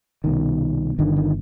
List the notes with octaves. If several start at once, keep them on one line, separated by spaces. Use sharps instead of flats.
C2 B2 D#3
G1 G2 D3 D#3
D#3